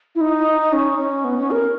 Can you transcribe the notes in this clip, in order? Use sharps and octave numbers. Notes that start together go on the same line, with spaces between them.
E4
D#4
C#4
C#4
B3
C#4
A#4